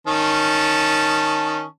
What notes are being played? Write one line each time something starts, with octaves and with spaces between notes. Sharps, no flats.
D#3 C#4 A5